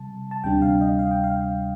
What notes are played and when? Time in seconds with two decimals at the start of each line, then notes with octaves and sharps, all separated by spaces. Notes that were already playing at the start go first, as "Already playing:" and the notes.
Already playing: C3 G3 A5
0.31 A5
0.44 D2 C3 G3 D4 G5
0.62 F5
0.81 D#5
0.99 F5
1.11 G5
1.24 F5